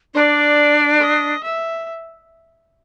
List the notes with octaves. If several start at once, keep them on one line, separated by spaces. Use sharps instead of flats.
D4 D5
D#5
E5